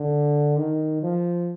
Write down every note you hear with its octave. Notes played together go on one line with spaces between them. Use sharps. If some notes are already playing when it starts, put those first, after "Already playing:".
Already playing: D3
D#3
F3